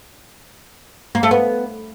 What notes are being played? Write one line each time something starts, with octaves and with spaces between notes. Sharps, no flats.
A#3
A3
B3